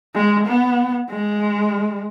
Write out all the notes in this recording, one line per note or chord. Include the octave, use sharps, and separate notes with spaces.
G#3
B3
G#3